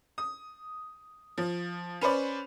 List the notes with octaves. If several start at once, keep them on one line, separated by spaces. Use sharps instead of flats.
D#6
F3
C#4 B4 C5 D5